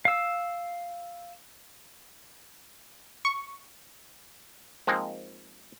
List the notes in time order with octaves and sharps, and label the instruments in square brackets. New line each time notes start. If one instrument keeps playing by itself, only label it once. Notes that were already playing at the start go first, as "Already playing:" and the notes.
[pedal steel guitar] F5 E6
[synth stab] C#6
[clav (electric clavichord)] F3 G#3 A#3 C4 D#4